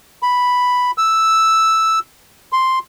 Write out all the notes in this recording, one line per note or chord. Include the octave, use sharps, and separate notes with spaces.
B5
E6
C6